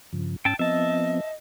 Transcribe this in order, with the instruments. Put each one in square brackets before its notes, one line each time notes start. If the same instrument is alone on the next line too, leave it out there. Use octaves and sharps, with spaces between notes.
[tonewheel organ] G2 C#3 F3
[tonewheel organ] G#2 C#4 E6 [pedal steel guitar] G5 A5
[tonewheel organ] F3 B3 C4 [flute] D#5 [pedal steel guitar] E5 A5